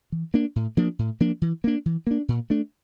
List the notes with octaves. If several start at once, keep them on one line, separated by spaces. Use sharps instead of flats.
E3
A#3 D4
A2
F3 A#3 D4
A2
F3 A#3 D4
E3
A#3 D4
E3
A#3 D4
A#2
A3 D4